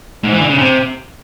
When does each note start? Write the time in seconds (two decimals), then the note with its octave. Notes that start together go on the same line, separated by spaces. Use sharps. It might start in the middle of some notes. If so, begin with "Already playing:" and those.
0.23 G#2
0.32 E3
0.41 D3
0.50 C#3
0.58 C3